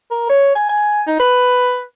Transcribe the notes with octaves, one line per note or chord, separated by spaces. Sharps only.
A#4
C#5
G#5
G#5
D#4
B4